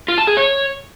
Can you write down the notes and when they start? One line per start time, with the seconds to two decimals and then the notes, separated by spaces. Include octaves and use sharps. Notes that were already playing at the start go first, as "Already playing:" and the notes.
0.08 F4
0.18 A5
0.27 G#4
0.37 C#5